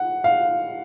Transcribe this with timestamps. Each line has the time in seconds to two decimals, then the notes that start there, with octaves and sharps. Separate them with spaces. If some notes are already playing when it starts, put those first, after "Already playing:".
Already playing: F#5
0.24 F5